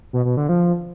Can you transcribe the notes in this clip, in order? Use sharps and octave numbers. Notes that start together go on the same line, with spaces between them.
B2
B2
D3
F3